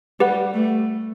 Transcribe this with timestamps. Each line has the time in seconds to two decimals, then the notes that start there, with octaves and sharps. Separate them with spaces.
0.20 G3 G4 B4 F#5
0.54 A3